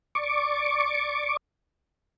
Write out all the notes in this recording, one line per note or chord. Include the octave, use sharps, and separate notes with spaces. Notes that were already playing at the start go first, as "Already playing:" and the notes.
D5 C#6 D6